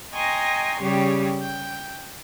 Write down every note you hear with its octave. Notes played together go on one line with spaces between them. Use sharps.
D#5 G5 G#5 A#5 C6 C#6
C#3 G3 G4 C#5
G5